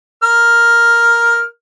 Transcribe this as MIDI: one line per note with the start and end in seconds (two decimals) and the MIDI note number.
0.23 1.44 70
0.23 1.44 89